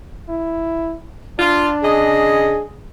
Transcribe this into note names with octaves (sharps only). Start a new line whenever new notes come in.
E4
D4 F4
C#3 G#4 D#5